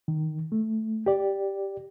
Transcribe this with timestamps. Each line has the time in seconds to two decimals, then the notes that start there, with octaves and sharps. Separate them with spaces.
0.08 D#3
0.52 A3
1.06 G4 D5